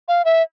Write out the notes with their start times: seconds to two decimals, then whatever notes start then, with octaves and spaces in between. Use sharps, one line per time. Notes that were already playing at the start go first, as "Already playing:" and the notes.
0.08 F5
0.25 E5